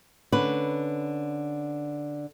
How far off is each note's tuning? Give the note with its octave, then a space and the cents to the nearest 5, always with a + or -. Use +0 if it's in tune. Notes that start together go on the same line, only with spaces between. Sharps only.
D3 +0 C#4 +0 B4 +0